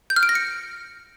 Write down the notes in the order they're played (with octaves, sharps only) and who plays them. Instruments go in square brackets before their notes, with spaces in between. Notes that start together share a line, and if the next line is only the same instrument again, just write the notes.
[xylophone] G6
F6
D7
A#6
C#7